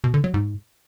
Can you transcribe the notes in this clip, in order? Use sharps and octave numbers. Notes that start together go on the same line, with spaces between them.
B2
D3
F#3
G#2